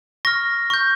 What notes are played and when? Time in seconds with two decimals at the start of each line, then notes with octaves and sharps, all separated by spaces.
0.25 C#6 F6 A#6
0.70 C#6 G6